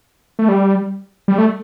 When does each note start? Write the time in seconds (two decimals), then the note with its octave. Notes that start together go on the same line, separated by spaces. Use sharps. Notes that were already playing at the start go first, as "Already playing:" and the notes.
0.39 A3
0.48 G3
1.28 G3
1.38 A3